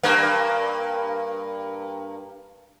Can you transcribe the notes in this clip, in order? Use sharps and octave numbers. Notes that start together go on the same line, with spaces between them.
G2 A#3